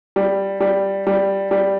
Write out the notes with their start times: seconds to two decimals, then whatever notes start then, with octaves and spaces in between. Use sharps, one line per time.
0.16 G3
0.60 G3
1.07 G3
1.51 G3